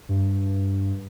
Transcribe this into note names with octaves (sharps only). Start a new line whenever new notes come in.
G2